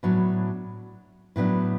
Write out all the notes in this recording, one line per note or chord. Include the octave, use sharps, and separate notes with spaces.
A2 F#3 B3 D4
A2 F#3 B3 D4